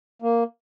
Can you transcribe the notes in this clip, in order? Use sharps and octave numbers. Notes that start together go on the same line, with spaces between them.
A#3